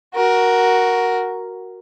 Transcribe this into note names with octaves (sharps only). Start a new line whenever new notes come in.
F#4 A#4